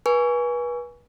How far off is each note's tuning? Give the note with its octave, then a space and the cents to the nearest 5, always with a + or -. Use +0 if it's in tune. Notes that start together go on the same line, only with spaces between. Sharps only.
B4 -30 G#5 +0 C#6 +30